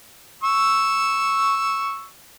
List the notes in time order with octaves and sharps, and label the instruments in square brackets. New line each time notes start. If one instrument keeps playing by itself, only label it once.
[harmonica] C#6 E6